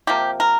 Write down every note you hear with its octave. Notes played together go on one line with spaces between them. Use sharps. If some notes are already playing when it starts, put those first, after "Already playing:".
C3 F3 A#3 G4
A#4